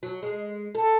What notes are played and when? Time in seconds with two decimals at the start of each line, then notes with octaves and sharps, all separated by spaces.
0.03 F#3
0.23 G#3
0.75 A4